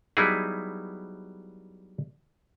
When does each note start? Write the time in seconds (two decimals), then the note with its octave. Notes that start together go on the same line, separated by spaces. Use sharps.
0.17 F#3 G3 B3 D#4 E4 G#4